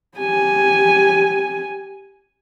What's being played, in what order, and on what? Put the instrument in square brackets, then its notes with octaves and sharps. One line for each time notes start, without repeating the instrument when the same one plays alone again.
[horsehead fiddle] G4 G#5